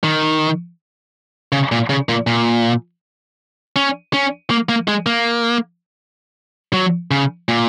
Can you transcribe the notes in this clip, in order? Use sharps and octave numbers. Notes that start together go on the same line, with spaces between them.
D#3
C#3
A#2
C#3
A#2
A#2
C#4
C#4
A#3
A#3
G#3
A#3
F#3
C#3
A#2